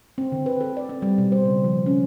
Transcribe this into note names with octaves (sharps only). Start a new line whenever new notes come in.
C4
D3
B4
A4
D5
C4
G3
B2
C5
C#3
F3
C#4